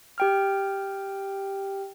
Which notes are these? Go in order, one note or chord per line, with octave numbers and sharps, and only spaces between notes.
G4 G5 F6